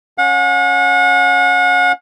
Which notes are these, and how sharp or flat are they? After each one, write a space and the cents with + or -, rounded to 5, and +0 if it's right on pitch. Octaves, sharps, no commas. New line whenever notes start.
C#4 +0 F#5 -40